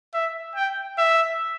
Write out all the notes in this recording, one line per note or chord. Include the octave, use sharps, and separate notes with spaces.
E5
G5
E5